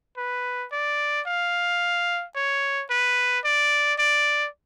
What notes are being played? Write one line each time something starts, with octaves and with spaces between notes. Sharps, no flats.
B4
D5
F5
C#5
B4
D5
D5